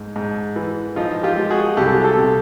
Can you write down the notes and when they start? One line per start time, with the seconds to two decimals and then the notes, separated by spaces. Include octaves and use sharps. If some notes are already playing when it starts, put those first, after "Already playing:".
Already playing: G#2
0.16 G#2
0.56 E3
0.96 F3 D#4 F4
1.23 F4 G4
1.37 G#3
1.50 F#4 G#4
1.77 C2 G4 A4
2.04 G4 A4
2.17 C3